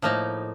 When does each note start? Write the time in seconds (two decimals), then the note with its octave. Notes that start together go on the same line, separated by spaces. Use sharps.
0.02 A2 F3 A#3 D#4